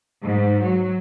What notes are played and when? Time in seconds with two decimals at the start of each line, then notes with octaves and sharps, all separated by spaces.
0.23 G#2
0.62 F#3